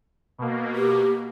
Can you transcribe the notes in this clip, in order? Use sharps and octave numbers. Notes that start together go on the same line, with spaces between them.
B2 A#3
G4